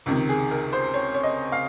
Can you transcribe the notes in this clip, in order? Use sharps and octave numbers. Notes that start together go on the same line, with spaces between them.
C#2 C3 D#3
G#4
A#4
C5
C#5
C#5
D#5
F5